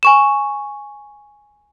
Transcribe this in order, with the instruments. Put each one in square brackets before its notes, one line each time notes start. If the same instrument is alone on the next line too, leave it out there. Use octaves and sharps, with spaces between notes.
[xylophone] G#5 C#6 E7